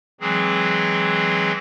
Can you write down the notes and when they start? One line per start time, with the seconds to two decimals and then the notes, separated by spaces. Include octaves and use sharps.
0.20 E3 F#3 G#3 C4 G#4